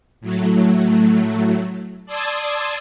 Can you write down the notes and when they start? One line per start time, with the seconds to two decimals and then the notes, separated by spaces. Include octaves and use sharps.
0.21 A2 F#3 A3
2.06 D5 A5 C6 D#6 E6 G#6